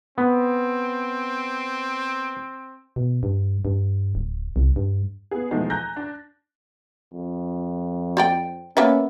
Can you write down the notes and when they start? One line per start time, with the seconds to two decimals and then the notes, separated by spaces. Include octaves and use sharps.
0.18 B3 C4
2.96 B2
3.23 G2
3.65 G2
4.15 D1
4.56 C2
4.76 G2
5.31 B3 G#4
5.51 E2 B2 F3 G#3 A3 D#4
5.70 G#5 A#5 F#6 G6 A#6
5.96 D4
7.13 F2
8.17 C5 D5 G5
8.77 A#3 B3 C#4 E5